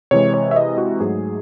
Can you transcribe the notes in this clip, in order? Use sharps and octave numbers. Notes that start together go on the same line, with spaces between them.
C3 E3 G#3 C#5
C#5
E5
D#5
F#4
G#2 F#3 A3 G#4